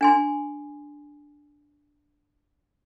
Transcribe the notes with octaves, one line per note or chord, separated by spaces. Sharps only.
D4 G#5 C6